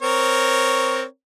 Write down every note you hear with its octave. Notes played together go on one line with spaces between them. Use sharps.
C4 A#4 C#5